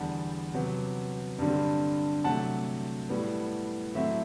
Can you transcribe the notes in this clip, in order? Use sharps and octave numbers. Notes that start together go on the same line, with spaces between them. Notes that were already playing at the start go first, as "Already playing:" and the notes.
Already playing: E2 D3 G3 F#5 A5
C3 F#3 B3
G2 D3 G3 C4
C3 F#3 A3 F#5 A5
A2 G3 B3
A2 F#3 A3 C4 E5